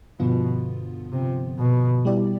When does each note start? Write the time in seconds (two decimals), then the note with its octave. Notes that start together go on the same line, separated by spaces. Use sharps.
0.19 G2 B2 D3 F3 B3 F4
1.12 C3
1.59 B2
2.05 G3 B3 E4 G4 D5